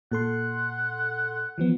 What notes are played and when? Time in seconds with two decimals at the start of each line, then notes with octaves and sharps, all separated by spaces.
0.12 A#2 A4 F#5 C6
1.58 E3 F3 B3